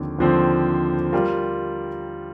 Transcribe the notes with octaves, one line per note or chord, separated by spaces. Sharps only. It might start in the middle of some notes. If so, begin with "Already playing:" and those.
Already playing: D#2 D3 F3 C4
D#2 D3 F3 C4
G3 F4 A#4